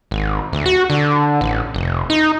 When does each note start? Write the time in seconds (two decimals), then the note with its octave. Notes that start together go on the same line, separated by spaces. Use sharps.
0.11 G#1
0.53 D2
0.66 F#4
0.90 D3
1.41 A1
1.74 F1
2.10 D#4